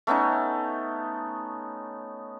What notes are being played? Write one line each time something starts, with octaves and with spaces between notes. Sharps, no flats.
A3 B3 C#4 D#4